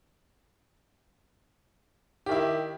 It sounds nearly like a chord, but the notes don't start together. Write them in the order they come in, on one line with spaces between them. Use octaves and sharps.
G4 D#3 E4